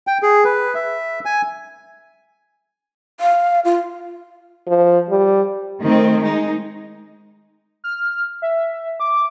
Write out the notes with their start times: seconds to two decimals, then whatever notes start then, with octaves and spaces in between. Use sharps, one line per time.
0.07 G5
0.23 G#4
0.45 B4
0.75 E5
1.25 G#5
3.20 F5
3.65 F4
4.67 F3
5.10 G3
5.82 D#3 A3 C4
6.22 G#3 D#4
7.84 F6
8.42 E5
9.00 D6